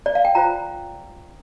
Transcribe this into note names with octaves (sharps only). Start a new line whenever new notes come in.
D5
F5
G5
F4 C5 A#5